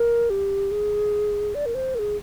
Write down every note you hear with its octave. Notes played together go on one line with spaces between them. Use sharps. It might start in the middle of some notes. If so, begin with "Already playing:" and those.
Already playing: A#4
G4
G#4
D5
A#4
C5
A#4
G#4